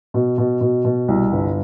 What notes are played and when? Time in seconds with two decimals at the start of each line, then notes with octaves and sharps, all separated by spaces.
0.14 B2
0.38 B2
0.61 B2
0.85 B2
1.08 C2
1.32 G1